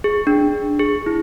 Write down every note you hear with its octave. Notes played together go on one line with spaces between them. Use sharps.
G#4
D4
G#4
E4